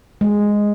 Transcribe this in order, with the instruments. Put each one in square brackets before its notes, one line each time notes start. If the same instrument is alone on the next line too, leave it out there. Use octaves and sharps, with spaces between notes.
[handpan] G#3